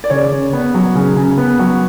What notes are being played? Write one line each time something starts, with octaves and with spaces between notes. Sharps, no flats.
D5
C#3 C#5
C#3
B3
F#3
C#3
C#3
B3
F#3